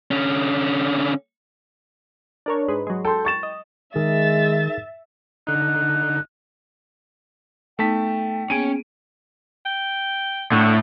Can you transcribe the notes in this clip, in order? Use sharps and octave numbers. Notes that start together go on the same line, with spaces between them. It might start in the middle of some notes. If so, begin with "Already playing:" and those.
D3 C#4
D4 A#4 C#5
G#2 G#3 B4
F#3 G#3
A4 G5 C6
C#6 A6 E7
D#5
D#3 G#3 D#4 G#4 A#4 E5 A6
D3 D#4 F#6
A3 B3 D#4 G5 A5 B6
A#3 B3 C#4 G#4 G#5 D7 D#7
G5
A2 D3